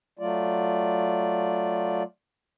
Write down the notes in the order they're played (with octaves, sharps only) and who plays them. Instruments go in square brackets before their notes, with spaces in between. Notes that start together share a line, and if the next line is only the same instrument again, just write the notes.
[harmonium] F#3 A3 F4 D5